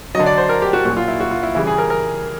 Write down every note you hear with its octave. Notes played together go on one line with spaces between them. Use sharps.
D3 F#3 D#5
D5
C5
A#4
G4
F#4
A#2 F#3 F#4
F4
E4
F#4
F4
E4
C#3 E3 G3 E4
G#4
A#4
A#4